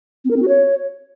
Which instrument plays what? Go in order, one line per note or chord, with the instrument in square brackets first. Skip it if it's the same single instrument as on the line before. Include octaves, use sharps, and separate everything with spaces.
[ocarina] C4
A#4
C4
F#4
C#5